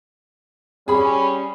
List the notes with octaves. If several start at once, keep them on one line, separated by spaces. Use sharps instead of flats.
G3 C#4 G#4 B5